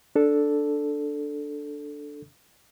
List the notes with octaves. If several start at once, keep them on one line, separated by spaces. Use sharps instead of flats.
D4 A4